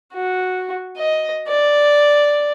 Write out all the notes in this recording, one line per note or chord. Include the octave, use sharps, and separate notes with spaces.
F#4
D#5
D5